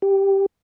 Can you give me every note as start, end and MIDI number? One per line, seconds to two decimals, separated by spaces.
0.02 0.46 67